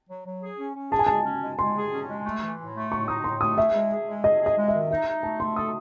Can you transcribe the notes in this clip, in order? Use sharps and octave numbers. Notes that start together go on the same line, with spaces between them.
F#3
F#3
G#4
C#4
C#4
G#4 A5
G#5
G#3 A5
C#4
G#3
G#3 C6
G#4
C#4
G#3
A3
E3
A2
A3
A2 C#6
D#4 D#6
A2 C6
A3 D#6
G#4 E5
G#3
G#4
G#3
G#4 D#5
G#4
D#5
G#3
E5
D#3
D#4 E5
D#4
A3 A5
A3 C6
A4 D#6